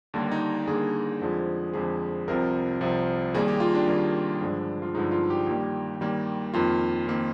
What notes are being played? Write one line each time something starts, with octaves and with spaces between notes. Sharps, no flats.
D#2 D3 G3 A#3 D4
D#4
D#2 D3 G3 A#3 G#4
F2 D3 F3 G#3
F2 D3 F3 G#3 G#4
C2 C3 F3 A#4
C2 C3 F3
D#2 D#3 G3 A#3 G#4
G4
F4
D4
D#2 D#3 G3 A#3
G2 D3 F3 G#3
F4
G2 D3 F3 G#3 D#4
F4
G4
D#2 D#3 G3 A#3 G4
D#2 D#3 G3 A#3
F2 D#3 A#3 F4
F2 D#3 A#3